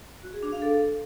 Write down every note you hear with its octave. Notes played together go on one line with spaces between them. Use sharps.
F#4
G#4
D4
F5
A4